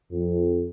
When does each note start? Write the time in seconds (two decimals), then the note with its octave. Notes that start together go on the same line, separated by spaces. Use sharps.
0.12 F2